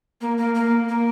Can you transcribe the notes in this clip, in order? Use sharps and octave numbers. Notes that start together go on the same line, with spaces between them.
A#3
A#3
A#3
A#3